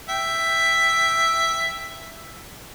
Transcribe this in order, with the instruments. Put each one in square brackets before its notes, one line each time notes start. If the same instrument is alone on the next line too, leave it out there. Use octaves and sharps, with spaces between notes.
[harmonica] E5 G5